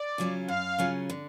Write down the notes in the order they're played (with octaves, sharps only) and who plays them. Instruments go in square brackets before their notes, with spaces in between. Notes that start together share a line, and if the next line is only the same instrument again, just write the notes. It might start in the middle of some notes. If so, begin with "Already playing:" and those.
Already playing: [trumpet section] D5
[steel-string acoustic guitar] C#3 F#3 C#4 F4
[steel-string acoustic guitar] F#2 [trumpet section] F5
[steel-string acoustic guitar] C#3 F#3 C#4 F4
D3